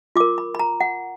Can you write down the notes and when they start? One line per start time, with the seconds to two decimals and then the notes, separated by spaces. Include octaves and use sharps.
0.16 F4 A#4 D6
0.38 B5
0.55 B5
0.59 A#5
0.81 F#5